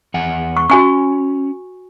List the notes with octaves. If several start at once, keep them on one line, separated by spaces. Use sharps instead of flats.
E2 F#5 G#5
C#6
C#4 F#4 G#5 C#6